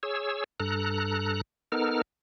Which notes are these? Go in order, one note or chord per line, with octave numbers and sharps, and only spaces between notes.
G#4 C#5 E6
G2 A4 A#5 F#6
B3 D#4 A4 A#4 F6